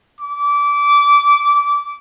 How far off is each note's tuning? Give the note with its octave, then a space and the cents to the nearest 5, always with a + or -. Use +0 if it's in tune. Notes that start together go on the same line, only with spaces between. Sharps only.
D6 -20